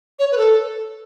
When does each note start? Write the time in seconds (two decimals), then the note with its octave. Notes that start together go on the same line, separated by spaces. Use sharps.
0.19 C#5
0.32 B4
0.38 A4